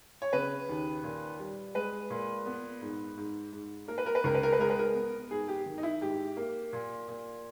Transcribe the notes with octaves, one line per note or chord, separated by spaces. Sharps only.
C#5
C#3 B4
D#2
A#2
G3
G#3 B4
A#2
B3
G#2
G#2
G#2
A#3 A#4
B4
A#4
B4
C#2 A#4
B4
A#4
B4
G#3 A#4
B4
A#4
B3
G#2 G#4
G4
D#3
D#4
E4
G#2 G4
A#3
A#2
A#2